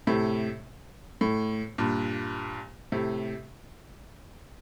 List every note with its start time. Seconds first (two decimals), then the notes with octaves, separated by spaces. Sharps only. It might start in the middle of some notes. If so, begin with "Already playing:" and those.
0.07 A2 C3
1.21 A2
1.78 G2 A#2
2.92 A2 C3